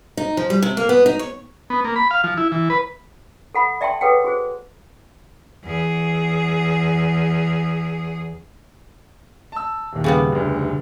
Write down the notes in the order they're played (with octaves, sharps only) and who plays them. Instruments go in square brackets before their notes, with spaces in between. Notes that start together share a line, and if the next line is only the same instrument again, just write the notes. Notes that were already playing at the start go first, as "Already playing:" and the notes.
[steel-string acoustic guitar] D#4
F3
G3
C3
A#3
B3
D#4
C#5
[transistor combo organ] B3
A#3
B5
F5
F3
E4
E3
B4
[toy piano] A4 F#5 B5
D5 E5 G5 A5 C6
G#4 A4 B4 C#5 F#5 G5
F#4 G#4 C5
[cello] E2 G#4
[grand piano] A5 E6
D#1 D#2
[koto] C#3 G3 B3
[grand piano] F1 D2